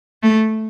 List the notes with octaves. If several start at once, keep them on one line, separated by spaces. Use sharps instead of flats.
A3